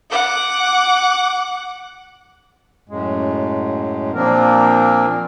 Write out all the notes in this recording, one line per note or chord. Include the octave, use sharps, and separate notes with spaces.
F#5 D6
F#2 A2 G#3
A#2 F3 A#3 C4 D4 A#4